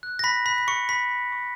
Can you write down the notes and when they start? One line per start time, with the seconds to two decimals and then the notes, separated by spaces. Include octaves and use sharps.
0.03 F#6
0.19 A#6
0.24 B5 B6
0.46 B5 F#6 B6
0.58 B6
0.68 C#6 C#7
0.89 B5 C#6 B6
1.32 C#6